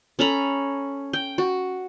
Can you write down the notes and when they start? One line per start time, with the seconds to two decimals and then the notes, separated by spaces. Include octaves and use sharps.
0.19 C#4 A4 A#5 B5
1.13 G5
1.38 F#4